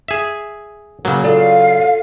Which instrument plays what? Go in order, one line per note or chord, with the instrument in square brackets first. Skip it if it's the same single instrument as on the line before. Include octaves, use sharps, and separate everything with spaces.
[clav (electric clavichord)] G#4 E5
[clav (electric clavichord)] C#3 F#3 [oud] A#3
[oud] F4 A4 D5 [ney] F5